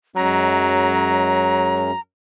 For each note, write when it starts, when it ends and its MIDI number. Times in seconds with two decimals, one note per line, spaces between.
0.16 1.91 42
0.16 1.94 54
0.16 1.91 56
0.16 1.91 61
0.16 2.00 82